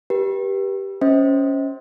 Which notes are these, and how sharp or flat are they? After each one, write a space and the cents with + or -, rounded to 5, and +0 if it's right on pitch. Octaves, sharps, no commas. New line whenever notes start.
G4 +0 B4 -35
C#4 +0 C5 +0 D#5 +45